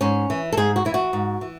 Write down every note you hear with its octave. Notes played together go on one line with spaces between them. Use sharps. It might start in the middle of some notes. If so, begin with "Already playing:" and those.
G#2 C#4
E3
A4
G#2 G#4
F#4
E3 E4
F#4
G#2
E3